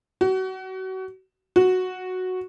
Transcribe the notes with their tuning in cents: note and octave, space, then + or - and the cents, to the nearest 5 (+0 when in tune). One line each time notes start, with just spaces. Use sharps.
F#4 +30
F#4 -5